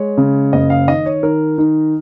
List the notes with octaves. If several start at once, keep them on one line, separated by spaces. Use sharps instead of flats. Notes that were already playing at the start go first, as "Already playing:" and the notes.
Already playing: G#3 C#5
C#3
F#1 D#5
F5
D#3 D#5
C#5
D#3 A#4
D#3 D#4